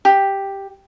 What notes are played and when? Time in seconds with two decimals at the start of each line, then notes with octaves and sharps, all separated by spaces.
0.05 G4